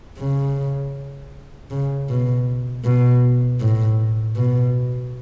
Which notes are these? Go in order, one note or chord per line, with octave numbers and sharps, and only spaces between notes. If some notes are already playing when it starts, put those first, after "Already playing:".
C#3
C#3
B2
B2
A2
B2